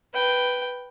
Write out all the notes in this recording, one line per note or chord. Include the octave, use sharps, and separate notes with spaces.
B4 G5